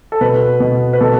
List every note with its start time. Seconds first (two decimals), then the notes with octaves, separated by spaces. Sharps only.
0.12 A4
0.21 B2 B4
0.60 B2
0.93 B4
1.01 B2 A4